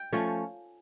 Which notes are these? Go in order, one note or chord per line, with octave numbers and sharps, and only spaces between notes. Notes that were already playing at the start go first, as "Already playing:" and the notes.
Already playing: G5
F3 A3 C#4